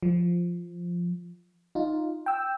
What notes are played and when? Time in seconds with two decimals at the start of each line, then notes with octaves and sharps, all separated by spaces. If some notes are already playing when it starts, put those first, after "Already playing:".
0.03 F3
1.75 D#4 F4
2.26 G5 E6